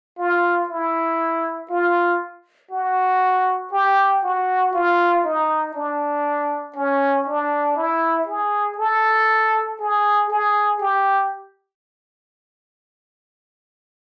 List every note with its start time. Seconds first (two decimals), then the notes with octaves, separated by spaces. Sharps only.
0.18 F4
0.69 E4
1.70 F4
2.71 F#4
3.72 G4
4.23 F#4
4.74 F4
5.24 D#4
5.74 D4
6.75 C#4
7.27 D4
7.77 E4
8.27 G#4
8.78 A4
9.79 G#4
10.30 G#4
10.80 G4